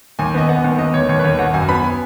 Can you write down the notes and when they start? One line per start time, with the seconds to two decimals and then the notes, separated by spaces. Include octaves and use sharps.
0.19 D#2 G#5
0.34 B3 D#5
0.49 B3 F#5
0.64 D#2
0.78 B3 D#5
0.94 D#2 C#5
1.09 D#2 C#5
1.19 B4
1.24 D#2 C#5
1.39 G#1 F#5
1.54 F#2 G#5
1.69 B3 B5
1.84 G#5